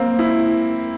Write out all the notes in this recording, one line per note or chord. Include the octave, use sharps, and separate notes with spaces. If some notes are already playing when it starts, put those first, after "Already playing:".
Already playing: A#3 C4
E4